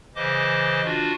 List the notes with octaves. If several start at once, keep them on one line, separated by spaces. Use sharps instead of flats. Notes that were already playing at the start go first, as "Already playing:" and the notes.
C#3 E3 C5 D#5 D6
D4 F4 F#4